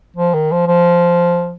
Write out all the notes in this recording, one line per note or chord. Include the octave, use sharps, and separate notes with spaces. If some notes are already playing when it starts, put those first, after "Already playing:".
F3
D#3
F3
F3